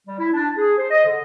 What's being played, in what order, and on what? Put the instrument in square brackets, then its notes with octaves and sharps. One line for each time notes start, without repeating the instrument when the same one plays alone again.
[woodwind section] G3
E4
D4
G#4
C5
D#5
D3